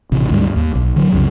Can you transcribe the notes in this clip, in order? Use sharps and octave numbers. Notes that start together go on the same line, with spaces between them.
A1 C3
D2 G#2 G3
D#2
B1
D3 F#3
C2 F#2 C#3